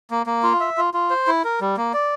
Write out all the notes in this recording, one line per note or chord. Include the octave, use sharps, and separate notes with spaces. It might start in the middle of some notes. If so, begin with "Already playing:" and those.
A#3
A#3
F4
E5
F4
F4
C5
E4
A#4
G3
A#3
D5